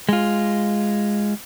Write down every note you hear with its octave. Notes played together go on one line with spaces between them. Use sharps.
G#3 F4